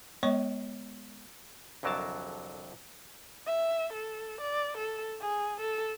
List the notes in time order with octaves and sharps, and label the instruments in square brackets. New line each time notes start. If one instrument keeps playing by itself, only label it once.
[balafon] G#3 B3 C#5 D#5 C#6
[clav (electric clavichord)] C2 F2 D3 F#3 A#4 A5
[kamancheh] E5
A4
D5
A4
G#4
A4